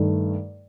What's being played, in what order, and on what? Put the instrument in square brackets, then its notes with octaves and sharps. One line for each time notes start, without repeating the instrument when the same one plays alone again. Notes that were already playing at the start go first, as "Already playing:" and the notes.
Already playing: [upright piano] G2 D#3 A3